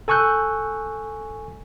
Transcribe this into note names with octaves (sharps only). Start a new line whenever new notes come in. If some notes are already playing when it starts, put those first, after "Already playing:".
A4 G#5 C#6 E6 F#6 G6